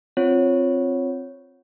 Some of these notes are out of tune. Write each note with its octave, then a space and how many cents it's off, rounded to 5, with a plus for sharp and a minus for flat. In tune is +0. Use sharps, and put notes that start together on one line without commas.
C4 +5 F4 +0 C#5 -5